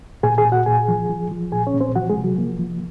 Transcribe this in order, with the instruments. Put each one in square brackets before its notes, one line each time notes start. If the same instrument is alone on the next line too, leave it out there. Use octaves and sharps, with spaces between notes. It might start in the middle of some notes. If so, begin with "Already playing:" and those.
[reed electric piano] A#2 G#4 G#5
G#4 G#5
A#2
F#4 F#5
A#2 G#4 G#5
F3
F3
F3
A#2 G#4 G#5
C#4 C#5
A#2
C4 C5
F3 F#4 F#5
G#3 G#4
C3
F#3 F#4
F3 A#3
F3